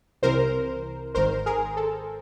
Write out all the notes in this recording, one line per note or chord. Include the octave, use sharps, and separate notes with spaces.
C2 C3 E3 A#4 C5
G#1 G#2 D#3 A#4 C5
G#4 A#4
A4